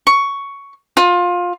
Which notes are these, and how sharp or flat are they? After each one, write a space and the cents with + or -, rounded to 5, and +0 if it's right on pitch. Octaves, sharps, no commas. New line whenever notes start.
C#6 +10
F4 +20